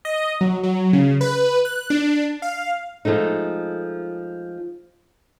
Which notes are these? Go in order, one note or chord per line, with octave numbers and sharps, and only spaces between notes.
D#5
F#3
F#3
C#3
B4
F#6
D4
F5
F3 G#3 A3 D#4